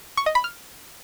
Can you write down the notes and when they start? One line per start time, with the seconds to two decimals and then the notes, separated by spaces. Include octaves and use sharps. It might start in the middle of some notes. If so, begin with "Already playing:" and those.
0.17 C#6
0.26 D#5
0.35 B5
0.44 F6